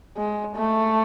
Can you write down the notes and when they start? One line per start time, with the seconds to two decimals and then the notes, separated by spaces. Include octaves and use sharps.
0.17 G#3
0.56 A3